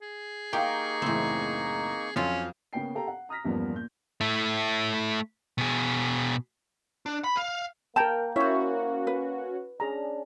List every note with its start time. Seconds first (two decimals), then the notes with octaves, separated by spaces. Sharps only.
0.01 G#4
0.53 A#3 D#4 G4 A#4 F5 G5 C6 C#6
1.02 F#1 A2 E3 C4
2.16 F2 F#3 C4 C#4 F4 F5
2.73 C#3 A#3 B3 C#4 G5 C7
2.95 G4 A4 F5 G5 A#5
3.07 F#5
3.29 A#5 D#6 F6 A#6 B6
3.44 E2 G2 F3 A#3 B3 C#4
3.73 A#2 G6
4.21 A3 E4
5.58 B2 G#4
7.06 D4
7.24 B5
7.37 F5
7.96 A#3 A#4 G5 A5 A#5
8.36 C#4 E4 F#4 C5 C#5 E5
9.07 B4
9.80 C#4 D4 G#4 A#5